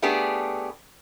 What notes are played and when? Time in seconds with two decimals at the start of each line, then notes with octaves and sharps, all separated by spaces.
0.02 A3 B3 D4 G4 G#4